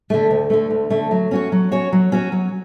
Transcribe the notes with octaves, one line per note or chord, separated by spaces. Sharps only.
D3 A3
D2
D3 A3
D2
D3 A3
F#3
C#4 F#4 C#5
F#3
C#4 F#4 C#5
F#3
C#4 F#4 C#5
F#3